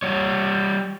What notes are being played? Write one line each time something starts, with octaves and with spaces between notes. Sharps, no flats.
G3 C#5